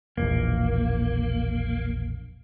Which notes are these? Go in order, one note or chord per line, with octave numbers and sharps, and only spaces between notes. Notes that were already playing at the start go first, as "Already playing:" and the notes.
E1 A#1 A#3